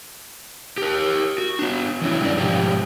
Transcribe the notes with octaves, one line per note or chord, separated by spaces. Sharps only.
G4 A#4
F#4
B3 D4
E3 F#3 C#4 E4
G2 G3 D#4 A#4 D5
G#2 B2 F3 G4